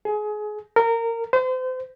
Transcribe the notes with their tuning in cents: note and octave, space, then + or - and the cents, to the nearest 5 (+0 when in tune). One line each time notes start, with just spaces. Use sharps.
G#4 +25
A#4 -20
C5 -35